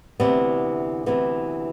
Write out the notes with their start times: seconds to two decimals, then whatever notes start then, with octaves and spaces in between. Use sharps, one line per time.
0.20 D2 C3 E3 B3
1.06 D2 C3 E3 B3